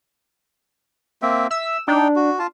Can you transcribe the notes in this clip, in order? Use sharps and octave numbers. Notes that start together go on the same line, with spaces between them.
A#3 C4 E5
E5 E6
D4 D#4 G5
F#4
F4 A5